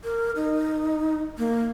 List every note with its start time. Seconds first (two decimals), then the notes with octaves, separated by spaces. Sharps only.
0.04 A#4
0.36 D#4
1.38 A#3